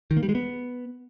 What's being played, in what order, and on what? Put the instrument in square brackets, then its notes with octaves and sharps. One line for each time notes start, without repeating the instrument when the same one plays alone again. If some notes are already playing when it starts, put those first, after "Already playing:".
[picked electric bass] D#3
A#3
G3
G#3
B3